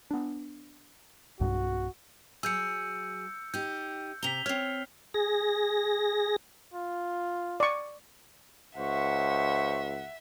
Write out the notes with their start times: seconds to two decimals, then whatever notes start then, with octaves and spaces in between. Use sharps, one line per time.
0.11 B3 D4
1.40 B1 G2 F#4
2.43 F#3 G#4 E6 G6 C#7
3.54 D#4 G4 G6
4.23 C3 A#5 B6 F7 G7
4.46 C4 C#5 F6 C7
5.14 G#4 A#6
6.74 F4
7.60 D5 C#6
8.78 C#2 C5 E5 F#5 C#6